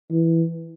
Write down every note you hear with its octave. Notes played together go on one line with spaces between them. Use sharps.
E3